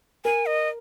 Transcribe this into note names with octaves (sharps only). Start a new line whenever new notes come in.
A#4 G#5
D#5